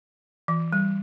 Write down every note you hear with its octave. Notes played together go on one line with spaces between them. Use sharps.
E3
G3